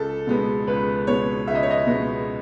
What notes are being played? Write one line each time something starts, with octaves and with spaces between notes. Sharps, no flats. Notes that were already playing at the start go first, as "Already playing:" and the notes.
Already playing: C#2 A4
B2 G#3 B3
C#2 B4
B2 G#3 B3 C#5
C#2 E5
D#5
C#5
D#5
B2 G#3 B3